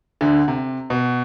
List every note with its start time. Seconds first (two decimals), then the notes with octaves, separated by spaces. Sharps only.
0.21 D2 D3
0.48 C3
0.90 B2